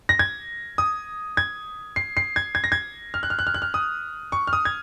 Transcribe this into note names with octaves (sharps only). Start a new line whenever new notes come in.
A#6
G#6
D#6
G#6
C7
C7
G#6
G#6
A#6
G#6
F6
F#6
F6
F#6
F6
F#6
F6
D#6
C#6
F6
D#6
G#6